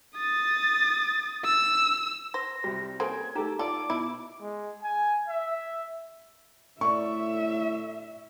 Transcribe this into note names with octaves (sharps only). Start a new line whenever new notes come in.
D#6 A6
E6
C5 A#6
C2 G3 F#4
C#3 A#3 A4 C5 G#5 G#6
A3 D#4 G4 A#5
F4 A4 D5 D6
B2 E4
G#3
G#5
E5
A2 D5 E5 C#6